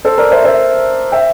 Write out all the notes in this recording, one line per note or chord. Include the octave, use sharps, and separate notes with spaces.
A4 C5
A#4 D5
C5 E5
C5 E5
E5 G5